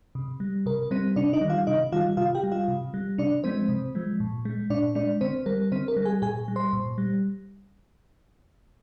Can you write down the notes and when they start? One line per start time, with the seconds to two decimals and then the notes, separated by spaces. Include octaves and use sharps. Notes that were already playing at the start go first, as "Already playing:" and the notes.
0.15 C3
0.40 G3
0.66 C3 A#4
0.91 G3 C4 C5
1.16 C3 D4 D5
1.33 D#4 D#5
1.41 D#3 G3
1.50 F4 F5
1.67 C3 D#4 D#5
1.92 D#3 G3 F4 F5
2.17 C3 F4 F5
2.35 G4 G5
2.44 G3
2.52 F4 F5
2.68 C3
2.94 G3
3.18 C3 D4 D5
3.44 F3 G#3 C4 C5
3.69 C3
3.95 F3 G#3
4.20 A#2
4.45 G#3
4.70 A#2 D4 D5
4.95 G#3 D4 D5
5.21 D3 C4 C5
5.46 G3 A#4
5.72 D3 C4 C5
5.88 A#4
5.97 G3
6.05 G#4 G#5
6.22 A#2 G#4 G#5
6.48 G3
6.56 C5 C6
6.73 A#2
6.98 G3